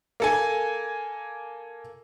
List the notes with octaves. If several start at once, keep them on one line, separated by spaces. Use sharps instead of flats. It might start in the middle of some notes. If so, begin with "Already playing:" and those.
A#3 A4 G#5